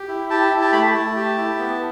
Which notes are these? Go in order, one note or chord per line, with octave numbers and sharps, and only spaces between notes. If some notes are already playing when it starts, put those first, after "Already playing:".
Already playing: G4
E4
G4 A5
E4
A5
A3 B5
A5
A3
G4
E4
B3